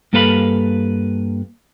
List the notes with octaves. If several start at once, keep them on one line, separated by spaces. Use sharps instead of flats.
G2 A#3 A4 B4 F5 B5